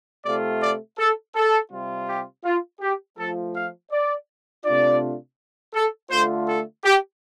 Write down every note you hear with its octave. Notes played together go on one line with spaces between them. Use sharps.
C3 A3 F4 D5
D5
A4
A4
C3 G3 F4
G4
F4
G4
F3 A3 F4 A4
F5
D5
C3 A3 D4 F4 D5
A4
D3 A3 F4 C5
A4
G4